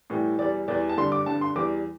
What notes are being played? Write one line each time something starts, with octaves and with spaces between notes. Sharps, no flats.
A2 E3 G3
E2 E3 G3 D5
E2 E3 G3 D5
A5
G2 D3 G3 C6
D6
G2 D3 G3 A5
C6
E2 E3 G3 D6